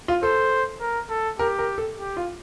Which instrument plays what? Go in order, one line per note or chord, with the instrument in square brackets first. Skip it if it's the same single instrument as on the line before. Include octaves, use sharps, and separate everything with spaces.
[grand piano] F4
[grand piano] A4 [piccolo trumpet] C5
[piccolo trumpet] A#4
A4
[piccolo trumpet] G4 [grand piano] A#4
[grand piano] A#4
A4
[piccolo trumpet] G4
[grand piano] F4